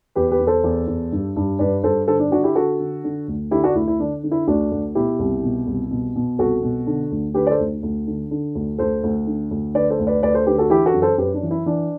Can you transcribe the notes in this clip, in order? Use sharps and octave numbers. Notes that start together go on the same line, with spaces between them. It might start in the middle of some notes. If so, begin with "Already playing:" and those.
E2 G4 B4
G4 B4
E2
A4 C5
E2
E2
G2
G2
G2 B4 D5
G2 A4 C5
D3 A4 C5
D4
D3 D4 F#4
E4 G4
D3 F#4 A4
D3
D3
D2
D3 E4 G4
D4 F#4
D2 E4
E4
D3 D4
D3
E4
D2 D4 F#4
D2
B2 E4 G4
C2
B2
C2
B2
B2
C2 F#4 A4
B2
D3
D2
D3 G4 B4
D5
A4 C5
D2
D2
D3
D3
D2
D2 A4 C5
D2
D3
D2
D3 B4 D5
A4 C5
D2
B4 D5
D2 B4 D5
A4 C5
D3 G4 B4
F#4 A4
E3 E4 G4
F#4 A4
F#2
A4 C5
F#2 G4 B4
D4
E3
E4
E3 D4